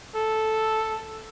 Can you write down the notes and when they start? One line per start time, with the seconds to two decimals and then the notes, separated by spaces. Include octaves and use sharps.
0.16 A4